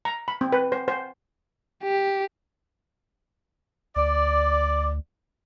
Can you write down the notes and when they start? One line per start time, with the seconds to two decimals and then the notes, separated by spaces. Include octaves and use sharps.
0.05 A#5
0.28 B5
0.41 C4
0.53 B4
0.72 C5
0.88 C5
1.83 G4
3.96 D2 D5